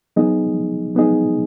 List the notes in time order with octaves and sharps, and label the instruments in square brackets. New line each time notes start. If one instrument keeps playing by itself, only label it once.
[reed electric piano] F#3 B3 D#4 G#4 D#5
F#3 B3 D#4 G#4 D#5